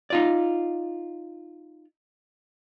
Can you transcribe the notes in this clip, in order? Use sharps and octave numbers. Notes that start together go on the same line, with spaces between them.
D#4 F4 D5